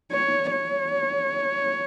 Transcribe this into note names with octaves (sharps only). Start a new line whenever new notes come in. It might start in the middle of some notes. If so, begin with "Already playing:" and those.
C#5
C#5